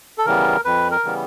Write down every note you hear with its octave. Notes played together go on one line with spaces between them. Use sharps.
A4
C#3 E3 G3 B3 A#4
F2 B4
A#4
C#3 E3 G3 B3